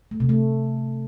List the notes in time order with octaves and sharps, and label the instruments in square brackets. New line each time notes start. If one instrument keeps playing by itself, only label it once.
[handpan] A3
C3
A3